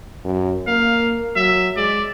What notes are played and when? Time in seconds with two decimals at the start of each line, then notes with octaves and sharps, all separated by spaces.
0.24 F#2
0.67 A#3 F5
1.36 F#3 E5
1.77 G#3 D5